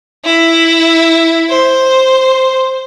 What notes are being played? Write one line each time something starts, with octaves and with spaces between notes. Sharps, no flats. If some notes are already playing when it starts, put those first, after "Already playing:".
E4
C5